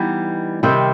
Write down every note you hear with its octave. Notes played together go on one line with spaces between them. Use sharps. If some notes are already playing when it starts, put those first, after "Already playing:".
Already playing: E3 G3 B3 D#4
C3 D#3 G3 C4